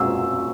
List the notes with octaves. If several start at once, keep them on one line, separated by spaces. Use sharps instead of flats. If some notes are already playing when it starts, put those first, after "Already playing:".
Already playing: A#3 C#4 F#4 E6